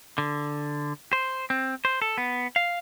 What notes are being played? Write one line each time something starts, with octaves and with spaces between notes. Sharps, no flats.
D3
C5
C4
C5
A4
B3
F5